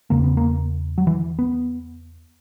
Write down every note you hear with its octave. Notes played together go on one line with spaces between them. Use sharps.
E2 C#3 A#3
B3
A#3
F#3
E3
B3